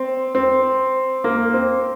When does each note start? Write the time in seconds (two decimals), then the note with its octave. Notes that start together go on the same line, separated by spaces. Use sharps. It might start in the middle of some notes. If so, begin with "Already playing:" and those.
Already playing: C4
0.35 C4
1.24 A#3
1.54 C4